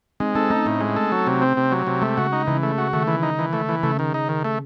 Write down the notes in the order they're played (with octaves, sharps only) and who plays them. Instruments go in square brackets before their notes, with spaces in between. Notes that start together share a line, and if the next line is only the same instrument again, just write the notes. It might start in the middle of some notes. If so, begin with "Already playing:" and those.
[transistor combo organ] G#3 [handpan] C4 D#4
[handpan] C4 D#4 [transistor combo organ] A4
[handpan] A3 C#4 [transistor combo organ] D#4
[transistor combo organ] A2 [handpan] A3
[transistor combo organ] G#3
A4
F#3
C3
C4
C3
F#3
C3
[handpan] G#3 [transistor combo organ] A3
[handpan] C#3 [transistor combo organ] F#4
[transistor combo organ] D#4
[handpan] C#3 [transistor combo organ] E3
[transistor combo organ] A3
F#4
[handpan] D#3 [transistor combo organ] A3
[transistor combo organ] E3
D#4
E3
A3
E3
[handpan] C#3 [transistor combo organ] A3
[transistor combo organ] D#3
D#4
D#3
A3